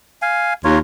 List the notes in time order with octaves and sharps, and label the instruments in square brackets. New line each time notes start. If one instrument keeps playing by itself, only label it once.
[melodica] F5 G#5
[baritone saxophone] D#2 [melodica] F4 A#4 C#5